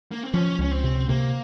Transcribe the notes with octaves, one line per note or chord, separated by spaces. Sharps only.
A#3
C4
F3 C#4
C#2 C#4
C4
C3
C3 A#3